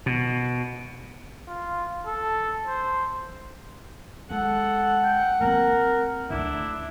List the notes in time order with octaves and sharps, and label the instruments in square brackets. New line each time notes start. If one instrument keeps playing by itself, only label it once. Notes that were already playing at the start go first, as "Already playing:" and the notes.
[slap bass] B2
[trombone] F4
A4
C5
[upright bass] G#3 [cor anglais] A4 [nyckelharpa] F#5
[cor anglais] G5
[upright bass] A#3 C4 [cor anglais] A#4
[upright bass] D2 D3 [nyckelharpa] D4 [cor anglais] E4